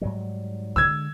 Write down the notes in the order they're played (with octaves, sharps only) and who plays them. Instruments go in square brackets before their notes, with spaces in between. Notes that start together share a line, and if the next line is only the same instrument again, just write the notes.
[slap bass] G#2 F#3 G3
[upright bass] D3 G#3 [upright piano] E6 G#6